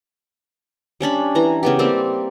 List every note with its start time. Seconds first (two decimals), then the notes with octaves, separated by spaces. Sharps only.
1.01 G3 C#4 D4 B5
1.35 E3 A#5
1.63 C#3 B3 G4
1.79 G3 A#3 C4 E5